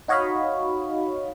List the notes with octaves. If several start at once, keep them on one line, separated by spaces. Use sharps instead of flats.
D#4 F#4 C#5 D#5 F5 B5